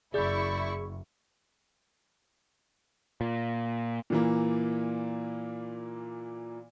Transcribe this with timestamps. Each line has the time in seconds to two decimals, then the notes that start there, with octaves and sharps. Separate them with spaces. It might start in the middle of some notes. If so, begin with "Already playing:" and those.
0.14 F#1 E4 G#4 D5 C#6 G6
3.21 A#2
4.10 A#2 E3 A#3